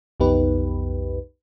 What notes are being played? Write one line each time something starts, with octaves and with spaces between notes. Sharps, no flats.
B1 F2 B3 D#4 G4 B4